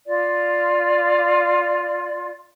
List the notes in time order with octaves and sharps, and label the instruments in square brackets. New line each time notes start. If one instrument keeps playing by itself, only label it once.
[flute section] F4 D5